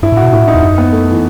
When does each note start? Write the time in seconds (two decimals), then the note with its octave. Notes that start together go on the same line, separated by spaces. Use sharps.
0.02 G2 E4
0.12 A2
0.17 F#4
0.22 B2
0.32 A2 E4
0.48 D#4
0.54 E2
0.62 F#2 D#4
0.78 B3
0.92 A3
1.11 E3